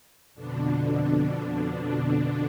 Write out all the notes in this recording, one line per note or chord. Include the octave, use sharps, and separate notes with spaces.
F2 B2 D3 D4